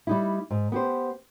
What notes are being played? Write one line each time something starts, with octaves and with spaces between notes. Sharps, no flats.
G3 D#4 E4
G#2
B3 G4 C5